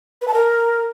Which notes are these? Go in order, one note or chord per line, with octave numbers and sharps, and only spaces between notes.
B4
A5
A#4